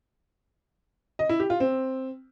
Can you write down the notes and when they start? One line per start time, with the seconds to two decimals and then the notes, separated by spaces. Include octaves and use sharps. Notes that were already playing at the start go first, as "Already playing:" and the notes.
1.19 D#5
1.29 E4
1.40 G4
1.50 F4
1.60 C4